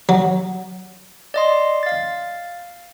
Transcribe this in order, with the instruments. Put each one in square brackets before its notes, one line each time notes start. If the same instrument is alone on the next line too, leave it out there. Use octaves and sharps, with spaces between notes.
[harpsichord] F#3
[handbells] D5 D#5 C6
F5 A6